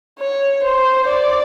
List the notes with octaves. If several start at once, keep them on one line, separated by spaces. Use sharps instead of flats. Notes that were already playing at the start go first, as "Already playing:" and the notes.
C#5
C5
D5